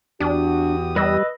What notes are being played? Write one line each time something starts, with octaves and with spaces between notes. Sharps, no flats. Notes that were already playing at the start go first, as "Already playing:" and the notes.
E2 D4 F#4 G4 D#6
G3 B4 D#5 E6